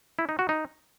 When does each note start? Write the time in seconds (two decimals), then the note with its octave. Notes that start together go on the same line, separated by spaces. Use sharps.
0.19 E4
0.29 D#4
0.39 F#4
0.49 D#4